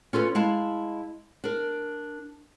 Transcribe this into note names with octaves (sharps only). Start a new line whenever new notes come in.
C#4 F4 A4 B4
G#3 E4 F5 A5
D4 A#4